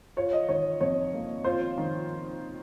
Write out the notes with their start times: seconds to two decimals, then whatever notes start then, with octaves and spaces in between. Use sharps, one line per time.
0.17 F4 C#5
0.33 D#5
0.48 D#3 C#5
0.81 F2 C#5
1.13 A#3
1.44 F4 C5
1.78 D#3